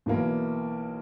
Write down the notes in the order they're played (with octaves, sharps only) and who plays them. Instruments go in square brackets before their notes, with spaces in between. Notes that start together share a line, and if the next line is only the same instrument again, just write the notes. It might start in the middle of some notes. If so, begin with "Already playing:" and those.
[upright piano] B1 E3 A#3